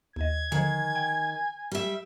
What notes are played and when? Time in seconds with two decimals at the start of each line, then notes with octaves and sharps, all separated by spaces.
0.16 D#2 D#5 G#6
0.52 D3 D#3 F3 G#5
0.95 G5
1.72 G3 E5